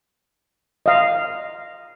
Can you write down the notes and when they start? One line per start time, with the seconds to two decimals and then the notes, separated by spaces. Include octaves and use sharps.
0.86 D#5 F5